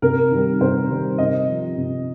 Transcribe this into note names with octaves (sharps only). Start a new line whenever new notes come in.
C3 A#4
D#3 G3
C3 C5
D#3 G3
C3 D#5
F3
C3